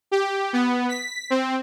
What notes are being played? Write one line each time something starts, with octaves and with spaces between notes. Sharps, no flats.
G4
B3
B6
C4